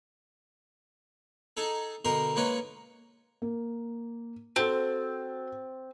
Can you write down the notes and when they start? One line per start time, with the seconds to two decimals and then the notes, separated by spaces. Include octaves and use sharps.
1.57 D#4 G#4 A4
2.05 B2 D3 D#4 A#4 C6
2.36 G#3 A#3 C#4 D#4 B4 C#5
3.42 A#3
4.56 C4 F#4 A4